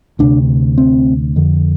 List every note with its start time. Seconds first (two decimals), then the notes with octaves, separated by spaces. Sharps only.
0.19 D2 C3 D4
0.78 C4
1.36 F2 D3